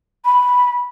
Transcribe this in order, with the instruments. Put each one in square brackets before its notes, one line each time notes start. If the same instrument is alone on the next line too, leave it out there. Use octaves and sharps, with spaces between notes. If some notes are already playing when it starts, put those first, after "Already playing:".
[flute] B5